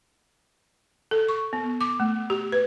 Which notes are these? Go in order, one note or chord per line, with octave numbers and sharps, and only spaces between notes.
A4
C#6
B3
D6
A3
G4
B4